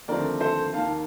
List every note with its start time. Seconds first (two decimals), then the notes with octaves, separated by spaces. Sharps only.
0.08 D#2 D3 F3 A3 C4 A#4 D5
0.41 A4 C5
0.74 D#2 D#3 A#3 F5 A5